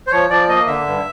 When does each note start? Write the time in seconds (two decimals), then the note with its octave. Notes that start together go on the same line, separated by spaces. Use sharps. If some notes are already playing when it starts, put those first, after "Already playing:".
0.07 C5
0.12 F3 C#5
0.30 F3 D5
0.48 A#3 D#5
0.67 D3 E5
0.86 G2